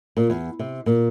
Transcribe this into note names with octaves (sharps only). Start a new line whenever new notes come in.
A#2
E2
C3
A#2